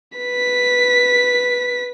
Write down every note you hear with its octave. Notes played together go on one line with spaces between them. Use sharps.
B4 B6